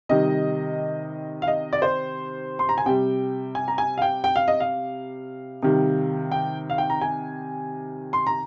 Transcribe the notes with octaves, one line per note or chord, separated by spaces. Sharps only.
C3 D#3 G3 D#5
F5
D#5
D5
C5
C6
A#5
G#5
C3 G3 G5
G#5
A#5
G#5
F5
G5
G5
F5
D#5
F5
C3 D#3 G3
G5
F5
G5
A#5
G#5
C6
A#5